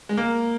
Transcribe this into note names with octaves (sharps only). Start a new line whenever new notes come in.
G#3
A#3